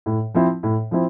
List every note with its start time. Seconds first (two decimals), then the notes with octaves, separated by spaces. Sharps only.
0.06 A2
0.34 F3 C4 E4
0.63 A2
0.91 F3 C4 E4